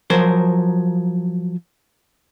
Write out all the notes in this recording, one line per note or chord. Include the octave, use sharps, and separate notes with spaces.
F3 F#3 A#4 C5